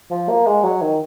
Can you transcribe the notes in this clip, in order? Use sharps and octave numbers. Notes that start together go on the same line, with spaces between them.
F3
A#3
G#3
F#3
D#3